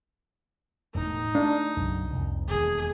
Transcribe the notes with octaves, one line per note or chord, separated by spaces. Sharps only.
E1 A2 D#4
A3 D4
B1 F#2 C#3
C2 F2
E1 D#2 G#4